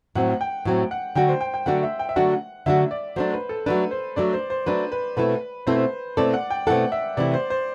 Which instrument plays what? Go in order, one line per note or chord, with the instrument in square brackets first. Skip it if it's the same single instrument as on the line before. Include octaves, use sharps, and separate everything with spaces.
[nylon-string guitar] A2 F#3 C4 [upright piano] F#5
[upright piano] G5
[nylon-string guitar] A2 F#3 C4
[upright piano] F#5
[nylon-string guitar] D3 F#3 A3 D4 F#4 [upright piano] G5
[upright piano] C5
G5
G5
[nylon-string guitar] D3 F#3 A3 D4 F#4 [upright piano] F#5
[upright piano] E5
G5
E5
[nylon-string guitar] D3 F#3 A3 D4 F#4 [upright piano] F#5
[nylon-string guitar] D3 F#3 A3 D4 F#4 [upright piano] E5
[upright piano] D5
[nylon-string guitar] F#3 A3 D4 [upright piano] C5
[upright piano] B4
A4
[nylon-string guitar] F#3 A3 D4 [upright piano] B4
[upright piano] C5
[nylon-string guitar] F#3 A3 D4 [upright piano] D5
[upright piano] C5
C5
[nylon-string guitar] F#3 A3 D4 [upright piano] B4
[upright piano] B4
[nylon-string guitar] B2 A3 C4 E4 A4 [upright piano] B4
[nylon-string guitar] B2 A3 C4 E4 A4 [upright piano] C5
[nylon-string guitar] B2 A3 C4 E4 A4 [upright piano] D5
[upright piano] F#5
G5
[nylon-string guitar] B2 A3 C4 E4 A4 [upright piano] F#5
[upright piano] E5
[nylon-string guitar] C3 E3 A3 E4 [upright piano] D5
[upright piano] C5
C5